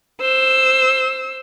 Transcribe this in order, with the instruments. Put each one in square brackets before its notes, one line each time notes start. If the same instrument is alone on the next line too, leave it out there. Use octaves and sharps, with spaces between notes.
[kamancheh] C5 E6